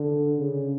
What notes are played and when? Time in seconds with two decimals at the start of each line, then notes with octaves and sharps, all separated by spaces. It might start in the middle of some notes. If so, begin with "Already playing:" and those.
Already playing: D3
0.38 C#3